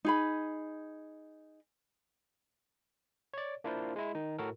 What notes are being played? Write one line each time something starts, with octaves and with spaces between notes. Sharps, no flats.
D#4 G#4 B5
C#5 D5
A#3 D4 E4 F4 A#4 C5
G#3 E4
D#3 D#4
A2 F#4 A4 A#4